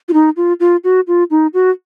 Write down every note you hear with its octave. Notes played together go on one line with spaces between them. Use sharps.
F4
D#4
F4
F4
F#4
F4
D#4
F#4